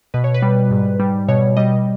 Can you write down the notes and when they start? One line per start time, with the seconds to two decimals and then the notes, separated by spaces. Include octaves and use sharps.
0.14 B2 B4
0.24 C#5
0.34 B4
0.42 G3
0.71 G#2
1.00 G3
1.28 B2 C#5
1.57 G3 D#5